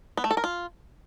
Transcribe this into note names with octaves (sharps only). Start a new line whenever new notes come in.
B3
A3
A4
A#4
F4